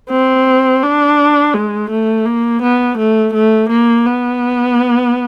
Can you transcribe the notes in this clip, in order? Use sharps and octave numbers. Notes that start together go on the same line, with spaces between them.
C4
D4
G#3
A3
A#3
B3
A3
A3
A#3
B3